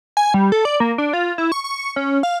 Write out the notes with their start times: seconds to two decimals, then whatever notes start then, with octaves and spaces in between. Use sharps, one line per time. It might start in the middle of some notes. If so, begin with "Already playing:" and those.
0.17 G#5
0.34 G3
0.52 A4
0.65 D5
0.80 A#3
0.98 D4
1.13 F4
1.38 E4
1.52 C#6
1.64 C#6
1.96 C#4
2.23 F5